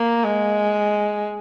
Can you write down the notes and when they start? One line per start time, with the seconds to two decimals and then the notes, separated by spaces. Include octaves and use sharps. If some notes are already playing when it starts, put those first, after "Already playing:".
Already playing: A#3
0.24 G#3